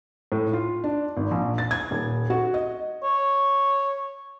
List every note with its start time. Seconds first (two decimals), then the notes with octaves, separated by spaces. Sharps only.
0.32 A2
0.53 F4
0.84 D4
1.17 G#1
1.31 A#1
1.58 A6
1.71 G#6
1.91 D#1
2.30 F#4
2.54 D#5
3.03 C#5